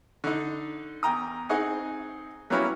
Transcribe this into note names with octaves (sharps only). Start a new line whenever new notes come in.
D3 D#4
E2 G5 A#5 D#6
C4 D#4 G#4 D#5 F#5 G#5
F#3 G3 A#3 B3 C#4 E4